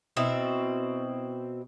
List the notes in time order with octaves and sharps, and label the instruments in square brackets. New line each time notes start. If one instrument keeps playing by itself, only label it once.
[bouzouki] B2 C4 E4